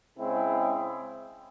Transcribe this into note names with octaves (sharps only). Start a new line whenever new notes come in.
C#3 G#3 C4 E4 G#4